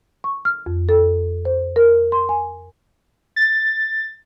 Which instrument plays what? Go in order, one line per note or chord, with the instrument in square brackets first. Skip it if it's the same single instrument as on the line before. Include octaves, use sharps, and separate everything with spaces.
[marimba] C#6
F6
F2
A4
C5
A#4
C6
G#5
[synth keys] A6